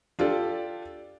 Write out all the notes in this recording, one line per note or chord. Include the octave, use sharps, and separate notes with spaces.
D4 F4 G4 A4 D5